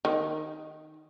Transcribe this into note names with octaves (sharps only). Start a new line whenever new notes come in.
D#3